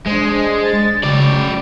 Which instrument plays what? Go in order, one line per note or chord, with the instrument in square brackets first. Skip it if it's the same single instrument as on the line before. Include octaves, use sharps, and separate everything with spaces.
[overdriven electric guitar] G#3 [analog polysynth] D4 C5
[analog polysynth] A6
[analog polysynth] C#3 [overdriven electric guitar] F#3 D5